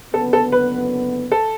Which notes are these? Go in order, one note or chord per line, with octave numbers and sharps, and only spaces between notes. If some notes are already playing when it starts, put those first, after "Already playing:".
F#1 F#2 D3 B3 A4
A4
B4
A4